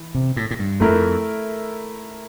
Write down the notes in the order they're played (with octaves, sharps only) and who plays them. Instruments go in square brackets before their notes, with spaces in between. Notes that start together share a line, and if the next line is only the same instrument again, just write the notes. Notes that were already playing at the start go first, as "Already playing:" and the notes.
Already playing: [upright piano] E3
[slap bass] C3
A2
A2
G2
[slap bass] F2 [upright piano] A3 E4 A#4